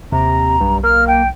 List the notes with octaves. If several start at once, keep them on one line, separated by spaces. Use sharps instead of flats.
D#2 C3 A#5
B1 G2
A#3 F6
G5